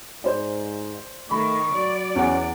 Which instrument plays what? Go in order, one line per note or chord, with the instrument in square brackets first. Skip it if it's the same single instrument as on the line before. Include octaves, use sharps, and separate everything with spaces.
[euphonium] G#2 [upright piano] C5 D5
[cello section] D#3 [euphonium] A3 [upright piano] B5 [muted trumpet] C#6
[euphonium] F#3 [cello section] D5
[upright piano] E2 F#5 [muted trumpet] C#4